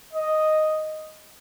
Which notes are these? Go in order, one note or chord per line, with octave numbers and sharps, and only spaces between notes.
D#5